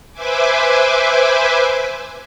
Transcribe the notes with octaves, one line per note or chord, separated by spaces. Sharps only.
B4 C5 E5 G#5 D6